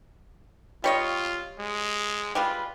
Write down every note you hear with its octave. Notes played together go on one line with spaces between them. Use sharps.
G3 F4 C#5 D#5
G#3
G3 G#3 F4 B4